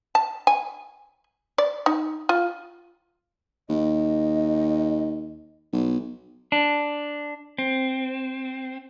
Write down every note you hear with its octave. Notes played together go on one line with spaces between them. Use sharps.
A5
G#5
D5
D#4
F4
D#2 D#5
B1
D4
C4